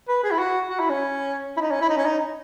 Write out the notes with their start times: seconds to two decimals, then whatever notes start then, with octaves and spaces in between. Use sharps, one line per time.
0.08 B4
0.23 G#4
0.31 E4
0.39 F#4
0.69 F#4
0.79 E4
0.90 C#4
1.57 E4
1.61 D#4
1.71 C#4
1.81 E4
1.89 D#4
1.97 C#4
2.05 D#4